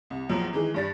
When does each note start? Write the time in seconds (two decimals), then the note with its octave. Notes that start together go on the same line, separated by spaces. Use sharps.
0.10 C2
0.29 A#1 E2 F3 F#3
0.53 D#3 E3 G#3
0.74 G2 D4 A6